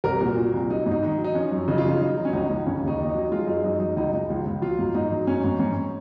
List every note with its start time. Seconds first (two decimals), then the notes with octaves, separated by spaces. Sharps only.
0.04 C2 A#4
0.20 A#2
0.26 F#4
0.37 A#2
0.53 C2
0.70 F#3 D#4
0.86 G#2
0.92 D#4
1.03 D#3
1.18 F#3
1.24 D#4
1.35 F3 C#4
1.52 F#2
1.68 C#3 D#4
1.78 F4
1.84 F3 D#4
2.00 F#3 D#4
2.17 F#3
2.25 C#4
2.33 C#2 D#4
2.49 C#2
2.66 C#3 C#4
2.82 D#2
2.87 D#4
2.99 D#2
3.09 D#4
3.14 F#3
3.32 G#3 F4
3.47 F#2 D#4
3.64 F#2 D#4
3.80 F#2 D#4
3.96 C#2 D#4
4.13 G#3 D#4
4.29 C#2 F4
4.46 C#2
4.61 F#3 F4
4.79 G#2
4.95 G#2 D#4
5.11 F#3
5.27 G#2 C#4
5.44 G#2
5.59 G#2 C#4